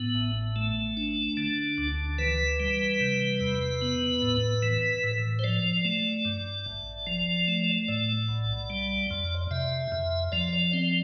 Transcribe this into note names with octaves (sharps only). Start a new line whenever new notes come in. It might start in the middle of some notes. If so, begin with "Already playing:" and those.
Already playing: A2 B3
A1
A3
D4
D3
D2
E3 B4
G3
C3
E2
B3
A2
E3
A2
C5
F3 D5
A3
G2
A1
F3
A3
A2 D5
B1
G3
F2
C3 E5
F2
F3 D5
D5
C4